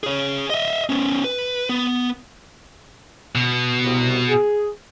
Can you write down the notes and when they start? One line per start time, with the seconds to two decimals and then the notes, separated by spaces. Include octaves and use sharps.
0.03 G#4 C#5
0.50 D#5 E5
0.89 B3 C#4
1.24 B4
1.69 B3
3.35 B2
3.84 C2 C3
4.29 G#4